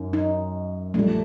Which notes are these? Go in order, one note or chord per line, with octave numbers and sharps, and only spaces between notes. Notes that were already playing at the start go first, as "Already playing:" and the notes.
Already playing: F#2 D#3
D#4
A#1 A#2 G3 A3